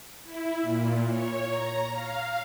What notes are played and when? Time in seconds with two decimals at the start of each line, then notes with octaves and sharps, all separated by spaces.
0.24 E4
0.62 A#2
1.08 C#5
1.49 A#5
1.92 F5